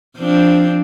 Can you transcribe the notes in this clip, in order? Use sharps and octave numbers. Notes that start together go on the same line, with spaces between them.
F3 C4 D4